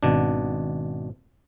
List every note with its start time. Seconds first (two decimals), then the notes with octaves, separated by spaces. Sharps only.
0.03 G#1 B2 D4